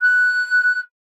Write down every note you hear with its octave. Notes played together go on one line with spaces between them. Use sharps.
F#6